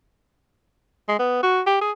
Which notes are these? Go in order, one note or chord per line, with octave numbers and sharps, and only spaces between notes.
G#3
B3
F#4
G4
G#4